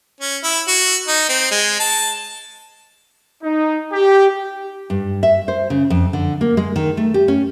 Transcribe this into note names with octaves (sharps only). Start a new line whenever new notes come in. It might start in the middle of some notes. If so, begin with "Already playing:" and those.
C#4
E4
F#4
D#4
C4
G#3
A5
D#4
G4
G2
E5
C5
C#3
F2
D3
A#3
G#3
D#3
A3
G4
C#4